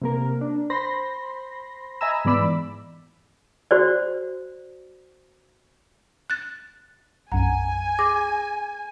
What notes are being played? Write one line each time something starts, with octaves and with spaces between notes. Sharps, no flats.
C3 A#3 A#4
D4
C5 B5 C6 A#6
D#5 E5 G#5 A#5 B5 E6
G#2 E3 B3 D5 B5 E6
F#4 C5 D5
F#6 A6
B1 F#2 F#5 G#5 A#5 D#7
G#4 D6 A#6